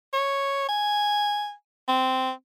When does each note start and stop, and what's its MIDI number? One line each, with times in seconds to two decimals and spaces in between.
0.13 0.64 73
0.68 1.52 80
1.88 2.31 60